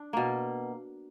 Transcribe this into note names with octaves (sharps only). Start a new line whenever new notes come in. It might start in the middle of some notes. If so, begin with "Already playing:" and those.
Already playing: D4
B2 A#3